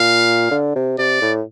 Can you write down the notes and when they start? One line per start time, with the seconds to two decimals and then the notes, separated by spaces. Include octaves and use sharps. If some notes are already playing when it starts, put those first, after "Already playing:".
Already playing: A#2 F5
0.51 D3
0.75 C3
0.98 C3 D5
1.21 A2